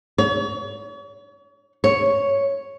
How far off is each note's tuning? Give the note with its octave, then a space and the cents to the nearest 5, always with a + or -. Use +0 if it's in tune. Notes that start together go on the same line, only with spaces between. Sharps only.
C#5 +40
C#5 +0